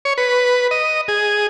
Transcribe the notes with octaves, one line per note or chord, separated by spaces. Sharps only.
C#5
B4
D#5
G#4